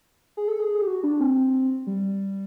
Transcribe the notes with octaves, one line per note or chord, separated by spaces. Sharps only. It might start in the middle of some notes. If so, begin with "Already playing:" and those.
G#4
A4
G#4
G4
F#4
D4
C4
G3